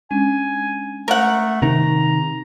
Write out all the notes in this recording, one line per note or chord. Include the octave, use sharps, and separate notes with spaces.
G#3 C#4 D4 G#5
A3 A#4 F#5
C3 D#3 A#5